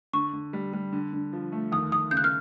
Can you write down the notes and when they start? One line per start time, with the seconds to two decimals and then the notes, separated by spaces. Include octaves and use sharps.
0.13 D3 C#6
0.33 D3
0.53 G3
0.73 G3
0.92 D3
1.13 D3
1.33 F3
1.52 A3
1.72 D#2 D#6
1.92 D#2 D#6
2.11 C#3 G6
2.17 F#6
2.24 F6